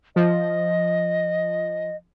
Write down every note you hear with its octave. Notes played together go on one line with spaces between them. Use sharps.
F3 D#5